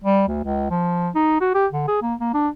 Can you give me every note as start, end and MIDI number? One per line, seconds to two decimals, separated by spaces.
0.04 0.25 55
0.28 0.43 38
0.44 0.70 37
0.70 1.09 53
1.15 1.39 63
1.41 1.54 66
1.54 1.67 67
1.73 1.86 50
1.88 1.99 68
2.02 2.14 58
2.20 2.29 58
2.34 2.49 62